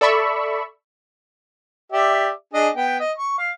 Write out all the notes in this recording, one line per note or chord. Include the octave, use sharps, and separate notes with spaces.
A4 D5 E5 B5 C#6 E6
G4 D5 E5
D4 G#4 D#5
B3 G5
D#5
C#6
F5